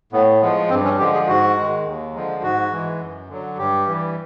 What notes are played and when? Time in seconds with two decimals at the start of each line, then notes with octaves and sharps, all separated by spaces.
0.13 A2 B3
0.41 F3 G#3 B3
0.70 G2 C4
0.85 C#4
0.99 D3 F3 G#3 G4
1.14 G#4
1.28 G#2 F#4
1.57 D#3 G#3
1.86 D#2
2.14 D3 F3 G#3
2.43 G#2 F#4
2.72 E3 G#3
3.00 F#2
3.29 D3 F#3
3.58 G2 G4
3.87 E3 G3